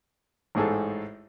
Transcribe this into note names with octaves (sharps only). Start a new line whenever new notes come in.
A1 G#2 G#4 A4